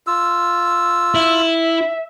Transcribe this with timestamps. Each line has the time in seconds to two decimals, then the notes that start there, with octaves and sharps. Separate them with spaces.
0.07 F4 E6
1.15 E4 E5